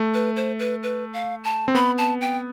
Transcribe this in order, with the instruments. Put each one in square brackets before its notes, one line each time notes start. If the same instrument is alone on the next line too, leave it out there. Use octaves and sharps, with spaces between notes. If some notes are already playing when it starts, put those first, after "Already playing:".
Already playing: [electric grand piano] A3
[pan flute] B4
C5
B4
B4
F5
A5
[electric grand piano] C4
[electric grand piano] B3 [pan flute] B5
[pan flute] A5
G5